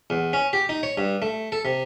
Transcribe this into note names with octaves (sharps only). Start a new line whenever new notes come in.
E2
C#4
G4
D#4
C#5
G2
A3
A4
C3